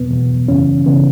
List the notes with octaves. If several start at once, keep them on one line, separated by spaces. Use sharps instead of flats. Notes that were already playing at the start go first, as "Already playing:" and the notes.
Already playing: E2 B2 B3
E2 B2
F#2 C#3 E3 C#4
C#3 E3 B3